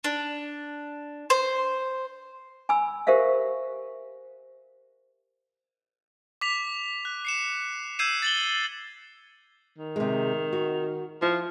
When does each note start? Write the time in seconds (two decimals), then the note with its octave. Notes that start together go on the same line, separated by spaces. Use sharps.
0.04 D4
1.30 C5
2.69 G#5 B5 E6
3.07 G4 A#4 C5 E5 F5
6.41 D6 B6 F7
7.05 F#6
7.25 C7 C#7 E7
7.99 E6 G6 G#6 C7 D#7 E7
8.22 A6 F#7 G7
9.78 D#3
9.96 C3 G#3
10.53 F#4
11.22 F3 E4